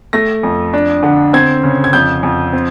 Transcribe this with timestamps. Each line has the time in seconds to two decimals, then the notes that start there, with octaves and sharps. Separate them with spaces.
0.13 A3 A#6
0.43 F2
0.73 D4
1.03 D3
1.33 C4 G#6
1.63 C#3
1.84 G#6
1.93 F2 G6
2.23 F2
2.53 C4